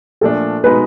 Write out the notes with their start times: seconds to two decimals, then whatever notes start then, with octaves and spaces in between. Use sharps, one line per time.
0.21 A#2 F3 A3 D4 A4
0.63 B2 G#3 B3 D#4 B4